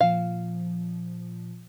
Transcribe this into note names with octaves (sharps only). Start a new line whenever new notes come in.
A#2 F3 F5